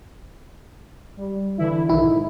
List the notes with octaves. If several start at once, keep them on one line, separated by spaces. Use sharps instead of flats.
G3
D3 E3 E4
B1 D#3 E4
G#2